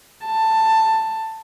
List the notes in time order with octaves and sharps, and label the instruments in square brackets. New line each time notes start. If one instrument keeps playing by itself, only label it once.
[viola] A5